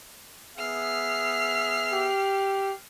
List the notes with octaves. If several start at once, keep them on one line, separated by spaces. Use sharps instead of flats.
B3 G#4 E5 F6 C7
G4